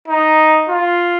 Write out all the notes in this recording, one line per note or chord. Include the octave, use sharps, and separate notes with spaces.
D#4
F4